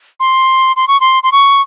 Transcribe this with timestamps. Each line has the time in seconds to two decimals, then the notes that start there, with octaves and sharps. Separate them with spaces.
0.20 C6
0.76 C6
0.88 C#6
1.00 C6
1.23 C6
1.32 C#6